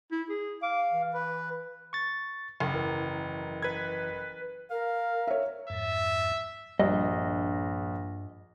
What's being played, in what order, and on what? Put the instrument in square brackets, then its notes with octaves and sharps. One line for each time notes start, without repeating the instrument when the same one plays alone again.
[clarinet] E4
G#4
[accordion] F5 [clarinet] D6
[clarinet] E3
[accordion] B4
[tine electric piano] C#6 A6
[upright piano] F#1
[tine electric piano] G#1 E3 A#4
[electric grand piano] B4 G#6
[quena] A#4 [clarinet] F5
[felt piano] C#5 E5
[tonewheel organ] F2 G#2 A6 [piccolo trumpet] E5
[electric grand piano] A#1 [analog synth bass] G2 [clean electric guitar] D#5